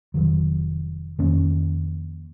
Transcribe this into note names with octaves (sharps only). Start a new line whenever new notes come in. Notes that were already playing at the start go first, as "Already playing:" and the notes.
F1 D#2 D#3 F#3
F2 D#3 A#3 C#4